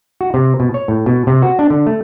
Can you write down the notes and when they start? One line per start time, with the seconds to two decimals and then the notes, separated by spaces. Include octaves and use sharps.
0.21 F#4
0.34 C3
0.60 B2
0.74 C#5
0.88 A2
1.06 B2
1.27 C3
1.42 F#4
1.59 D4
1.70 D3
1.86 A3